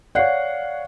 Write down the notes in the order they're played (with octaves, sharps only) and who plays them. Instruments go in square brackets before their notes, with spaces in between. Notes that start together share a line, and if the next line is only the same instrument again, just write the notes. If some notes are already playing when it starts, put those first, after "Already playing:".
[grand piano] C#5 F5 F#5 [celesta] D5 F#6 C7